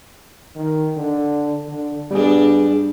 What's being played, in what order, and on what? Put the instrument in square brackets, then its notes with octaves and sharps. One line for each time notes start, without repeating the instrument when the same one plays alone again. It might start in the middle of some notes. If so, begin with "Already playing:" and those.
[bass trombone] D#3
D3
D3
[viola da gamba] G2 D4 [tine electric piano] G3 G#4 [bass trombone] B3